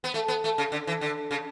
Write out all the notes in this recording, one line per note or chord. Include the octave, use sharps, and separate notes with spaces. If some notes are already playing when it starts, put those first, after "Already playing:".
B3
A3
B3
A3
C#3
D3
E3
D3
C#3